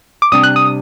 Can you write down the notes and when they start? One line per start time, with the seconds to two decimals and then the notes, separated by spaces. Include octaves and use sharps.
0.22 D6
0.32 C3 G3 D4 D#6
0.44 F#6
0.56 D#6